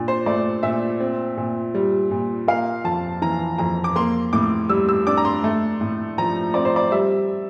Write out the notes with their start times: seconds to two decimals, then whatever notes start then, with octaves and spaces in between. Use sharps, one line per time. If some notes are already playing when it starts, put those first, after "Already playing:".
Already playing: A#2 D4
0.08 C5
0.26 A3 D5
0.63 A#2 E5
1.00 C4
1.37 A#2
1.74 G3
2.11 A#2
2.48 A#3 F5
2.84 F2 A5
3.22 E3 A#5
3.58 F2 A#5
3.84 D6
3.96 A#3 C6
4.33 A2 D6
4.69 G3 E6
4.89 E6
5.07 D4 D6
5.17 A#5
5.25 C6
5.44 A3
5.81 A2
6.18 F3 A#5
6.54 C4 D5
6.65 C5
6.76 D5
6.91 G3 E5